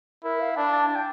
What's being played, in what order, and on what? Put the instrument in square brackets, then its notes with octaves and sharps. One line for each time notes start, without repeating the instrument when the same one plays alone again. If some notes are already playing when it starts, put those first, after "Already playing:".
[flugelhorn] E4 [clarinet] A#4
[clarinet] F5
[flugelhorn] D4 [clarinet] A5
[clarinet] A5
A5
G5